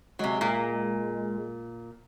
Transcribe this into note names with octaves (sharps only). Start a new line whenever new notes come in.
C3 F#3 G#3
A#2